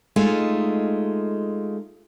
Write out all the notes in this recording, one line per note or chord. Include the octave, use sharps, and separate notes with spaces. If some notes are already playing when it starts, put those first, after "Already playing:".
G#3 A3 D#4 F4